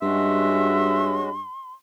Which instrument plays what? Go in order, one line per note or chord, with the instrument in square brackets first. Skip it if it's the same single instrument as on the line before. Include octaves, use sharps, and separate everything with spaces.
[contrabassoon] G2 [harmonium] G#3 C#4 F#4 [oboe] E5 [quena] C6